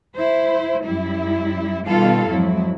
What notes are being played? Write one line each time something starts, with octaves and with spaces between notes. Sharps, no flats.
E4 C5
F#2 G3 E4
B2 D#3 G3 F4 A4 F5
F2 G#2 F#3 E4